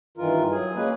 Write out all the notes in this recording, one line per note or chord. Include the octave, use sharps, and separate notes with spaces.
G2 D#3 E3 F4 A#4
F#3 G#4 G#5
G#3 A#3 C#4 G#4 B4